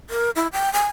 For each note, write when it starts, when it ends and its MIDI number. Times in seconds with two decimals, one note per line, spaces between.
0.10 0.30 70
0.36 0.47 64
0.53 0.72 79
0.73 0.86 80